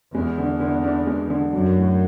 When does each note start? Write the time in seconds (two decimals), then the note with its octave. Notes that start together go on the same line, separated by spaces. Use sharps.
0.14 E2 G#3
0.38 D3
0.60 D3
0.84 D4
1.07 G#3
1.30 D3
1.53 F#2 F#3
1.77 A2